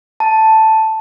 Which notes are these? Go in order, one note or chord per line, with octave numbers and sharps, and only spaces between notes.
A5